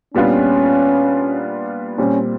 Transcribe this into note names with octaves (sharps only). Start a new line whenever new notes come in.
A#2 G3 B3 C#4 D4 F4
A#2 G3 C4 C#4